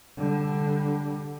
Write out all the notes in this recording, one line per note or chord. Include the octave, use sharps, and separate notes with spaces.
D3 G3